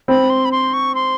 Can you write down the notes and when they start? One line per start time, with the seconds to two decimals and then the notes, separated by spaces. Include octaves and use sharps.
0.08 C4 B5
0.30 C6
0.45 B5
0.52 C6
0.73 C#6
0.95 C6